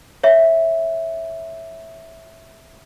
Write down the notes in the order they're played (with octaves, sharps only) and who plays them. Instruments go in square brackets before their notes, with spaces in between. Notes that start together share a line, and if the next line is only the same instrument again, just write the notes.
[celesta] C#5 E5